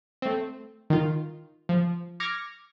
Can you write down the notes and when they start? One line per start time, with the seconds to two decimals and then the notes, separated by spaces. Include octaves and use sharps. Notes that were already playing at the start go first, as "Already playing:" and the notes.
0.22 A3 C4
0.90 D#3 F4
1.69 F3
2.20 D6 F6 G#6 A#6 C#7